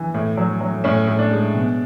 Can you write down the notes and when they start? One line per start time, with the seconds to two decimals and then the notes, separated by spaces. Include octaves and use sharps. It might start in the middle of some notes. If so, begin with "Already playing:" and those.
Already playing: E3
0.14 A2
0.37 F#3
0.61 F#3
0.84 A2 C#4
1.07 A2
1.19 D4
1.31 G#3
1.54 B2